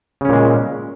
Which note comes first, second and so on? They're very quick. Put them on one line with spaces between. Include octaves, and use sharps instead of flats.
C#3 C#4 A#2 G#3